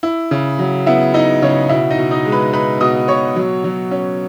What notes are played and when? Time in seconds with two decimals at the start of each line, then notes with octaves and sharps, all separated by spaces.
0.03 E4
0.31 C#3
0.59 F#3
0.86 B3 E4 E5
1.14 D#4 E4 D#5
1.42 C#3 C#4 C#5
1.69 B2 E4 E5
1.90 D#4 D#5
1.98 B2
2.11 D#4 D#5
2.26 G#3
2.32 B4 B5
2.53 D#4 B4 B5
2.80 B2 D#5 D#6
3.08 B2 C#5 C#6
3.36 F#3
3.64 F#3
3.91 C#4